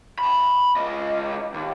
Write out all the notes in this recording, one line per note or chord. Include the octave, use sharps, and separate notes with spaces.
A5 B5
C#2 D#5
D#2